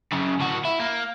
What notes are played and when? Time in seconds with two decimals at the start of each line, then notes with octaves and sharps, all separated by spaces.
0.13 F#2 C#3
0.41 A2 F#4
0.65 E4
0.79 A#3